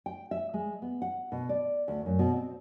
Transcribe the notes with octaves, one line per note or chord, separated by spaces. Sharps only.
G5
E5
G#3
B3
F#5
B2
D5
D2
F#2
B2
C4